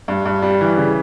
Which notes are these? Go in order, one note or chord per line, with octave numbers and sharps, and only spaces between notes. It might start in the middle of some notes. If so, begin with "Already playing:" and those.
G2
G2
G3
E3
C#3